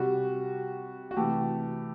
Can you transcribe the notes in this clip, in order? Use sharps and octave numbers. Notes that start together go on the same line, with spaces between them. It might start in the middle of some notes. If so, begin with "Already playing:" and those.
Already playing: C3 G3 F#4
F#4
C3 E3 A3 G4